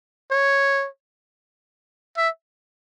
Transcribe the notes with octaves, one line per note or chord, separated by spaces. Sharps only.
C#5
E5